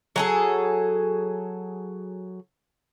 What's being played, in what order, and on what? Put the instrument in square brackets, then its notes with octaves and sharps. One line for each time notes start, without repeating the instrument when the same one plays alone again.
[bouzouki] F#3 G#4 A4